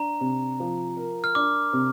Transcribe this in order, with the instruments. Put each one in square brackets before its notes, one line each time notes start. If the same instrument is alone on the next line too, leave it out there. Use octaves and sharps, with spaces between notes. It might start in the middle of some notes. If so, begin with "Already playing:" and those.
Already playing: [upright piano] D4 [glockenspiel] A#5
[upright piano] C3
F3
A#4
[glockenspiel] F6
[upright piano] D4 [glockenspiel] D6
[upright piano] C3